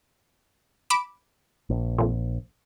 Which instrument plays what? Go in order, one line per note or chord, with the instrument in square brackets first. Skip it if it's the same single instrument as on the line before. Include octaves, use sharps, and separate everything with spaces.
[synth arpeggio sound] B5 D6 E7
[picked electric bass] A#1
[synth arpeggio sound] F2 A#2